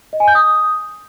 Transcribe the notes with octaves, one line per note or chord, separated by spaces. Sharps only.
D#5
G#5
G6
D#6